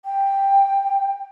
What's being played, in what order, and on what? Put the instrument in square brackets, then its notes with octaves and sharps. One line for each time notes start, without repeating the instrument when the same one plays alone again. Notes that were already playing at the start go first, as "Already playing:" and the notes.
[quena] G5